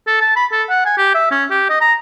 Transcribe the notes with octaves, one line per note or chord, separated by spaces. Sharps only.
A4
A5
B5
A4
F#5
G#5
G4
E5
C#4
G4
D#5
A#5